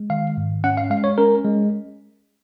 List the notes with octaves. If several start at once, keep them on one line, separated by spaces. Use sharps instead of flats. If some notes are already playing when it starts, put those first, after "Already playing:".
Already playing: G#3
D#3 F5
G#2
C#4 F#5
F5
G#3 F5
C#5
C#4 A#4
G#3